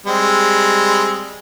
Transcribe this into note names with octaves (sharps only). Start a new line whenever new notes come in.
G3 G#3 C4